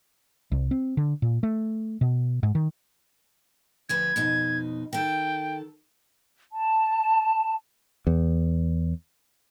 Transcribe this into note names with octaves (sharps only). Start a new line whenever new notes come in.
C2
C4
D3
A#2
A3
B2
G#2
D#3
D2 F3 B4 G#6
F2 B2 D#4
D#3 A4 G5
A5
E2